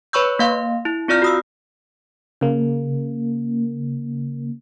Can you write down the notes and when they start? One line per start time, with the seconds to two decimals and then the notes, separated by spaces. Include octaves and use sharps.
0.13 B4 C#5 B5 C#6 E6 G6
0.39 A#3 F5 C6
0.85 E4
1.08 C4 F4 D5 F6 G6 A#6
1.22 F#4 D#6 E6
2.41 C#3 A#3